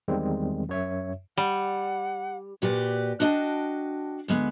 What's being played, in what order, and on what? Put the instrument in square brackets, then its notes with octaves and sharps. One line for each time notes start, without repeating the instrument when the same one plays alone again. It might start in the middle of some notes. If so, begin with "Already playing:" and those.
[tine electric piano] E2 D#3 G3 G#3 C4
F#2 C#5 E5
[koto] G3 [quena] F#5
[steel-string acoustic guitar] A#2 F#4 G4 B4 D5
D4 F#4 D#5 F#5 G5 A5
D2 G#3 B3